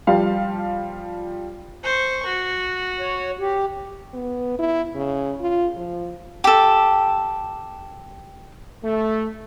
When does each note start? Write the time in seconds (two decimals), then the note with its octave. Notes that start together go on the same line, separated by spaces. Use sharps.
0.07 F3 G3 F5
1.83 C5 C#6
2.26 F#4
3.00 C#5
3.39 G4
4.14 B3
4.59 E4
4.95 C#3
5.40 F4
5.77 F3
6.44 G4 A4
8.83 A3